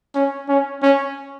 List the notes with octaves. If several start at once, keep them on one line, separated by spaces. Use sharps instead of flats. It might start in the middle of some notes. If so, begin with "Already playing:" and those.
C#4
C#4
C#4